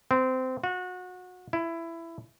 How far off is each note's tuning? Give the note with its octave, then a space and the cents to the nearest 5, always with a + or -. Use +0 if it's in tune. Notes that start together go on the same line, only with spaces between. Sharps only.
C4 -20
F#4 -25
E4 +15